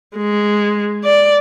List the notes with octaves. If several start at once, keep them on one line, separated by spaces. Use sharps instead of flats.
G#3
D5